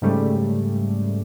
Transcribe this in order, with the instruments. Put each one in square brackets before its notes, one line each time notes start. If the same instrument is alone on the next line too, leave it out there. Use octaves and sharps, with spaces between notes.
[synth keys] G#2 C#3 G3 A3